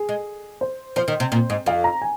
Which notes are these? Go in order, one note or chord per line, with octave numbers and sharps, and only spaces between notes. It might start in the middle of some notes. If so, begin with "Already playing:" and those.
Already playing: G#4
G#3
C5
F3 C5
D#3
C3
A#2
G#2
F2 F5
A#5
G#5